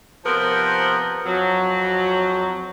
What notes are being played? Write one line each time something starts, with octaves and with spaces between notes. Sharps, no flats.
C3 F3 B3 A#4
F2 F#3